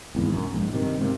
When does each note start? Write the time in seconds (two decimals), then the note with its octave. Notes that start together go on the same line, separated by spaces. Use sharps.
0.15 G#1 E2 G#2
0.33 E1 F#2
0.53 A#1 G#2
0.72 G2 C3 D#3
0.99 G#2 C3 A#3